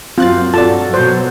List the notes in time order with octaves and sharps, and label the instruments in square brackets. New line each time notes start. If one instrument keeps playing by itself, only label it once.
[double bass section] F#2 [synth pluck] C4 F#6 A6 [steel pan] F4
[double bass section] G2 F#3 [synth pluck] F4 D5 [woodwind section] F#4 A4 [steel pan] A5
[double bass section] B2 F#3 [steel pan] C5